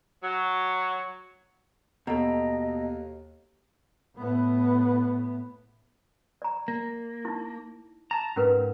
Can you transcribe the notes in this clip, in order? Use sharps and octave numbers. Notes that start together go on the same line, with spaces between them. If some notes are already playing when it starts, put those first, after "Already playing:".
F#3
D#2 B2 A4 D#5 A#5
A2 B3
D5 A#5
A#3
D#4 E4
A5 A#5
G#2 C#4 A#4 B4